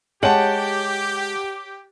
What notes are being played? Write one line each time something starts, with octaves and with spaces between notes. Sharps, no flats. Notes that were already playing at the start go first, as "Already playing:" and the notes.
G#3 G4 C#5 F#5 A5